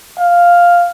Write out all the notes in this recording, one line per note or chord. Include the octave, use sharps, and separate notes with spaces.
F5